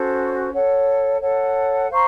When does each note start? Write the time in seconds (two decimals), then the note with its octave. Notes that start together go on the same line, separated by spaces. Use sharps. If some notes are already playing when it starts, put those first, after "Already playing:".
Already playing: C#4 F#4 A4 C5
0.51 A4 C#5 F#5
1.20 A4 C#5 F#5
1.89 C5 F5 A#5 C#6